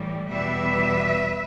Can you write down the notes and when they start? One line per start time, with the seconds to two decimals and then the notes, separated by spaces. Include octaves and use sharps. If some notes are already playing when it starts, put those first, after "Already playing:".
Already playing: A2 E3 G3
0.29 E2 B2 G3 B4 E5